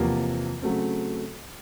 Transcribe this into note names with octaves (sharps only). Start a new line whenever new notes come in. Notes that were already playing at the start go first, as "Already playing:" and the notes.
Already playing: E2 C3 F3 A#3
C#3 F#3 A3 C4